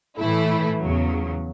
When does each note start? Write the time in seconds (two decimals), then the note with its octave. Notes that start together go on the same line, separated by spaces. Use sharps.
0.17 A2 E3 A3 E4
0.79 E2 C#3 F#3